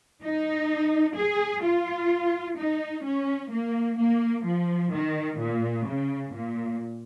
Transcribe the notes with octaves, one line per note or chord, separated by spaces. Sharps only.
D#4
G#4
F4
D#4
C#4
A#3
A#3
F3
D#3
A#2
C#3
A#2